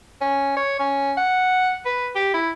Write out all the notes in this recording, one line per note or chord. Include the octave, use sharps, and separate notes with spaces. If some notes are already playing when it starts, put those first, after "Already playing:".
C#4
C#5
C#4
F#5
B4
G4
E4